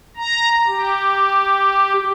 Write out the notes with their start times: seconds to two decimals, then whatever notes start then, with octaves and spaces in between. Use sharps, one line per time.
0.16 A#5
0.67 G4